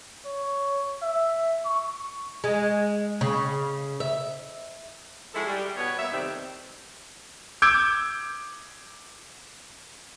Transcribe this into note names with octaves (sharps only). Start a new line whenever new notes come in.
C#5
E5
C#6
G#3
C#3
E5
F3 G#3 E4 F#4 G#4 A4
G3
B2 B3 C#5
G3 A#3 B3 E5
F2 C3 D#3 G3 C4 D#4
D6 E6 G6 G#6 D7